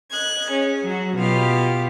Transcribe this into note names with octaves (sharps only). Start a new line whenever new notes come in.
D#5 F#6 G#6
C#4 G#4
F#3 F#4
B2 F4 G4 F5